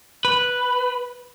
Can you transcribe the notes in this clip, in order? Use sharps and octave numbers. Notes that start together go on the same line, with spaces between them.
B4